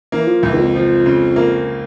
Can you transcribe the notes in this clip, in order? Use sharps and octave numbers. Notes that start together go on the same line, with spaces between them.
E3 A#3
F3
C#2 E3
E2
F2
F3
C#3
A#3